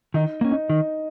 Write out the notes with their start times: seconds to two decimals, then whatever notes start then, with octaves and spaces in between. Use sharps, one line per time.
0.14 D#3 D#4
0.41 A#3 C#4
0.51 D#4
0.69 D#3 D#4